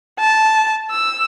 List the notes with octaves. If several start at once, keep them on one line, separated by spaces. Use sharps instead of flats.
A5
E6